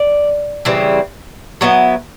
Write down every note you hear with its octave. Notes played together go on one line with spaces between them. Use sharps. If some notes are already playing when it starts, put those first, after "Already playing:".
Already playing: D5
C#3 E3 G3 C4
F#3 B3 E4 D#5